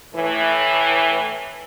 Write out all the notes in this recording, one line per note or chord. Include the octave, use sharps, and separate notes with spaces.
A2 E3